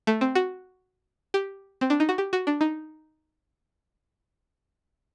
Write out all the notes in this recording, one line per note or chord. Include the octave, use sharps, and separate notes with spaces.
A3
C4
F#4
G4
C4
D4
D#4
F#4
G4
F#4
D4
D#4